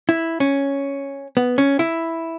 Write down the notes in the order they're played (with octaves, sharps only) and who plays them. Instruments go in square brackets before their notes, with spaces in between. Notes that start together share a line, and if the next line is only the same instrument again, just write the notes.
[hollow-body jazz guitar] E4
C#4
B3
C#4
E4